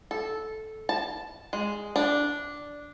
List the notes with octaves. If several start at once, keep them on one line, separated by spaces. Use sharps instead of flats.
A4
A5
G#3
D4